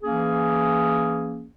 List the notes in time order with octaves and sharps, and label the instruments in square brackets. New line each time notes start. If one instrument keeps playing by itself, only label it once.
[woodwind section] E3 A#3 C#4 G#4